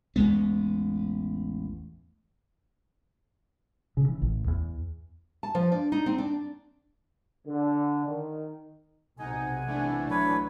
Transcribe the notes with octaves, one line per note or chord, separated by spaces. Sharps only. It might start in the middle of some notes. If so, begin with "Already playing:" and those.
A1 E2 G#3 B3
C#3
E3
A1
E2
A5
F3
D4
D#4
C4
D4
D3
D#3
B1 C3 D#4 A4 F#5 G#5
E3 A3 D4
F#3 B4 C#5